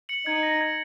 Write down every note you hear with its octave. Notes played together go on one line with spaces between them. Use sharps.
C#7 F#7
D#4 G#6 C#7
A#6
G#6